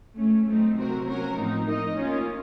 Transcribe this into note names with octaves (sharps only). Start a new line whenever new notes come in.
A#2 A3 C#4
F#3 A3 C4 D#4
C3 F#3 C4 F#4 A#4
F#3 A#3 C#4 F#4 A#4
A2 F3 C4 D#4
A#3 D#4 A#4 D#5
A#3 C#4 F4